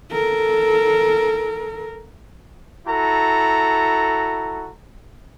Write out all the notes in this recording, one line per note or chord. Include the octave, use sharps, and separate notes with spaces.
A4 A#4
E4 F#4 A4 A#5